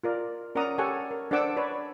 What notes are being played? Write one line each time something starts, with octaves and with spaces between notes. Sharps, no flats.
F4 A#4 D5
C#4 A#4 D5 F#5 A#5 D#6
G4 A4 C#5 F#5 G#5 C#6
A#4
D4 A4 C5 F#5 D6 E6
B4 C#5 D5